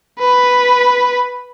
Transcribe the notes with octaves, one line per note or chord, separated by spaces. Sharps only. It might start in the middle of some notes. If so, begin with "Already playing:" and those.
B4